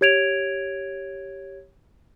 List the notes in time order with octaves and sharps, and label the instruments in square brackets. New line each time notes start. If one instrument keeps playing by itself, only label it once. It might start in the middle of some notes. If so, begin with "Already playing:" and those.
[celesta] G4 C#5 G#6 D7 F7